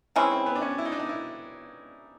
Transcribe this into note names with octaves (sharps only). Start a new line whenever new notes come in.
E3 G#3 C4 C#4 E4
C4
B3
D4
C#4
E4
D#4
D4
D#4
E4